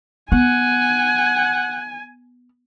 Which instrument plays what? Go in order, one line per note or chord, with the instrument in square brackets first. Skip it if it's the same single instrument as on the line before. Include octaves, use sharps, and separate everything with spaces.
[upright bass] B3 [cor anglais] F#5 [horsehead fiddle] G#5